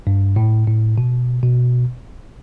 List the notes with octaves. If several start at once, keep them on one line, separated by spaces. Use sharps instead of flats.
G2
A2
A2
B2
B2